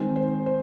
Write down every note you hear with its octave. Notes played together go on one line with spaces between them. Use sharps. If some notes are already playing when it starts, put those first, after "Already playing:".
Already playing: D#3 G#3 C4
C5
C5